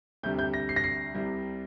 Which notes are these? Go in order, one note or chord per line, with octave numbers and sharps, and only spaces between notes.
D2 C3 G3 G6
G6
A#6
C7
A#6
C7
C2 C3 G3